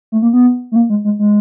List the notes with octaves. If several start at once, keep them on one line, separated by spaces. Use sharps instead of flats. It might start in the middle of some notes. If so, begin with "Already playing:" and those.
A3
A#3
B3
A3
A#3
G#3
G#3
G#3